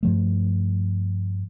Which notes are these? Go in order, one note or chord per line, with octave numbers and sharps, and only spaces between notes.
G2 F3 A3